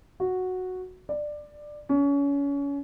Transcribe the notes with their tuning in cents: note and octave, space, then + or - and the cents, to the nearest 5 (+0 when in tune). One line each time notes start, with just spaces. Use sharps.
F#4 -5
D5 +15
C#4 +30